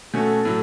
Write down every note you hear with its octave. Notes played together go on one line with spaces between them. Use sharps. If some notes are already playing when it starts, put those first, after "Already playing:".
B2 A3 C#4 F#4 A4
A2 F#3